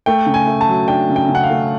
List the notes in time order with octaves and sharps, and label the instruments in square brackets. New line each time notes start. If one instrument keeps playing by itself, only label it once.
[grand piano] A3 G5
C#3
G#5
A3
A5
F#3
D4 G5
C#3
G5
C#3
F#5
F5
A3